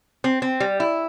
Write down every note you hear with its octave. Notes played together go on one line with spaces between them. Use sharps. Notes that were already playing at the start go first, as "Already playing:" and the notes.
C4
C4
G3
E4